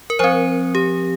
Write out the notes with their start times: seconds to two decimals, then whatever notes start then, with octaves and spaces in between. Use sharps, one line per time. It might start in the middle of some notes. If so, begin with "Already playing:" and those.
0.10 A#4
0.19 F3 C4 C5
0.75 G4